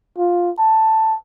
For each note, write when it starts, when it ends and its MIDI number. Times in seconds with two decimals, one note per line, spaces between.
0.18 0.51 65
0.59 1.15 81